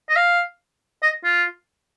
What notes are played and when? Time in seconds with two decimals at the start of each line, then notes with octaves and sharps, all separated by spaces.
0.09 D#5
0.16 F5
1.02 D#5
1.24 F4